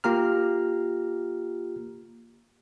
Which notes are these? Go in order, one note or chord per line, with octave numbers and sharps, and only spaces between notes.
A#3 F4 G4 A#5 F6